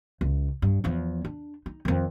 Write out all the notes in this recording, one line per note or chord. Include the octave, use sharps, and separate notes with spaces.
C#2
G2
E2 F3
D4
D#4
F2 D#3